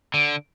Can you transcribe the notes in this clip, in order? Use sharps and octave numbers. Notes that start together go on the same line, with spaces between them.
D3